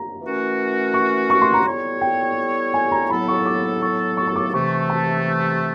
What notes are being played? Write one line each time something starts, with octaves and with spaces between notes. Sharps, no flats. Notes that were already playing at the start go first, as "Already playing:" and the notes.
Already playing: A#5
E3 A3 C#4 F#4 A#4
C#6
C#6
C6
A#5
G3 B3 E4 A4 C#5
G5
G#5
A#5
A2 F#3 B3 E4 A4 B5
C#6
D6
C#6
C#6
C#6
D6
C3 E3 A3 C#6
A5